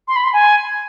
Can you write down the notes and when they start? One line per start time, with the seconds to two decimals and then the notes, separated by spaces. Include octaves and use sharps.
0.08 C6
0.16 B5
0.24 C6
0.33 G#5